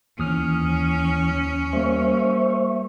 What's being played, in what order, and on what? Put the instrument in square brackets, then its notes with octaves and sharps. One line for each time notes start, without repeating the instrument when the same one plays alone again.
[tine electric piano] D#2 D#6 F6 [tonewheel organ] E3 [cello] C#4
[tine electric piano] G3 A#3 [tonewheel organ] C5 E5 C#6